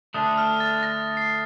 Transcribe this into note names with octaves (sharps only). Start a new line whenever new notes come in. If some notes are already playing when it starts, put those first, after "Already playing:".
D3 A3 D4 D#6
F6
A6
A#6
C7